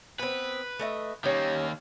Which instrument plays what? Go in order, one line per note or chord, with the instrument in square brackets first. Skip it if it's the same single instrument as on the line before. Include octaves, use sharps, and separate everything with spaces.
[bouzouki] B3 C4 [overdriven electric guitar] B4
[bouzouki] A3 D#5 E5
[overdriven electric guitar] D#3 A#3 [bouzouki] G3 C#4